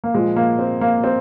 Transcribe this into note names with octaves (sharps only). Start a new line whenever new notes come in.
A#3
A#2 F3 G#3
A#3
C4
A#3
C4